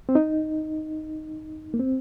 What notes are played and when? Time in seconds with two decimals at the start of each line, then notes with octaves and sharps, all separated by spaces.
0.09 C4
0.15 D#4
1.74 A#3
1.80 C4